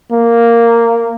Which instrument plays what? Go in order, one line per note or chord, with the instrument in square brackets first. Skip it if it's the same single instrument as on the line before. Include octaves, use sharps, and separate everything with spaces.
[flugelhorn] A#3